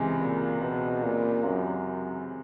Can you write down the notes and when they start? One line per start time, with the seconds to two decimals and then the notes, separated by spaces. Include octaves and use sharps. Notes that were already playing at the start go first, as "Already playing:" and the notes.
Already playing: C#2 C3 E3 G#3
0.20 A#2
0.61 B2
1.03 A#2
1.45 F#2